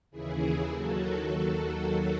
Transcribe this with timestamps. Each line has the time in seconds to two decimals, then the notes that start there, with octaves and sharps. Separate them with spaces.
0.11 D#2 C#3 E3 E4 G#4
0.68 D#2 D#3 F#3 F#4 A4